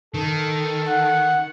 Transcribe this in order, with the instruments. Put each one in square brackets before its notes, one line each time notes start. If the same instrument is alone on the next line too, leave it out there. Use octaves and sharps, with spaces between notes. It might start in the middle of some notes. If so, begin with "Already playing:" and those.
[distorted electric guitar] D#3 [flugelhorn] A4
[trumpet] F#5